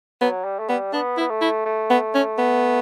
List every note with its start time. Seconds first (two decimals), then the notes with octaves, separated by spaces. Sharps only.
0.21 F#3 B3
0.44 G3
0.59 A3
0.69 G3 B3
0.93 B3 D4
1.17 B3 E4
1.30 A3
1.42 E4
1.65 A3
1.90 B3
2.15 C#4
2.38 B3